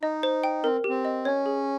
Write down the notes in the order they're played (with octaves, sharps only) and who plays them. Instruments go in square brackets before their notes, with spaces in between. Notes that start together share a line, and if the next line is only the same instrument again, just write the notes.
[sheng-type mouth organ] D#4 [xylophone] D#5
[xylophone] C5
G5
[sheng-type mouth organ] C4 [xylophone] A#4
[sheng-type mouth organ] C4 [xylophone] G4
[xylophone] D#5
[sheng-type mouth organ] C#4 [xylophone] C#5
[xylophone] G#4